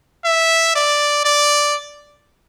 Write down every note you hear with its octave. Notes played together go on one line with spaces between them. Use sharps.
E5
D5
D5